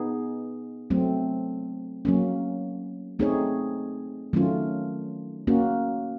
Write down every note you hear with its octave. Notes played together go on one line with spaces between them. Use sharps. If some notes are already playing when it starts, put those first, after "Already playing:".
Already playing: B3 D#4 G#4
F#3 A3 C4
F#3 A#3 C#4
A3 C4 D#4 G#4 C#5
D#3 F#3 A3 C#4 F4
A#3 C#4 F#4